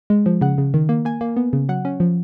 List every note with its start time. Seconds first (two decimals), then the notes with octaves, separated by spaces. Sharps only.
0.10 G#3
0.26 F3
0.41 C#3 F#5
0.58 C#3
0.74 D#3
0.89 A#3
1.05 A#3 G#5
1.21 A#3
1.37 B3
1.53 C#3
1.69 F#3 F#5
1.85 C#4
2.00 F3